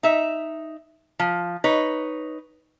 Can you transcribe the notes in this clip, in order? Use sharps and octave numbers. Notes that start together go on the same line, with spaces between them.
D#4 E5
F3
D#4 B4 C#5